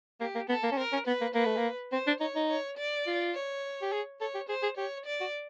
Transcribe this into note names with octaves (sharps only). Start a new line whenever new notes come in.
A#3 G4
A#3
B3 A4
A#3
C#4
C4 A#4
C#4
B3 B4
A#3
A#3 B4
A3
A#3
C4 C5
D4
D#4 C#5
D#4
C#5
D5
F4
C#5
G4
G#4
A4 C#5
G4
G#4 C5
G#4
G4 C#5
D5
F#4